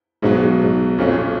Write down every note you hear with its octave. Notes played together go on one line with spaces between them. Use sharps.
B1 G#2 B2 F#3
G#2
B1 F2 A#2 F#3 C#4